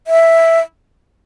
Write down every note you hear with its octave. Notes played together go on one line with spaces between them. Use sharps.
E5